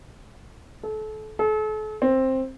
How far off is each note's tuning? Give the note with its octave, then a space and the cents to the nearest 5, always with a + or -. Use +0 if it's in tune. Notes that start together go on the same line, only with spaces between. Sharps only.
A4 -30
A4 -40
C4 +10